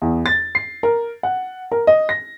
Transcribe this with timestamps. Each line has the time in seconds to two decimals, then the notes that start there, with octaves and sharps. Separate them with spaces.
0.02 E2
0.26 A6
0.55 C7
0.83 A#4
1.23 F#5
1.72 A#4
1.87 D#5
2.09 A#6